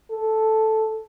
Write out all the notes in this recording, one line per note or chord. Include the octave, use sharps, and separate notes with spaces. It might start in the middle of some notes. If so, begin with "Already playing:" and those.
A4